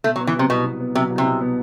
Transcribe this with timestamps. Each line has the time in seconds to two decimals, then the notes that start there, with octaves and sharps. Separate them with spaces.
0.04 B2 A3
0.16 F#3
0.20 B3
0.27 E3
0.36 C3 F#3
0.50 C2 B2
0.66 B2
0.80 B3
0.95 C3 F#3
1.10 C2
1.18 C3
1.25 B2
1.41 B3